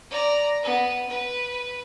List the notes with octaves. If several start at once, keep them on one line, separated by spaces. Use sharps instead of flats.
D5 A#5
B3
B4